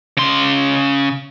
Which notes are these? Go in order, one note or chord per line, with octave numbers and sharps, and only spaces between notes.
C#3 C6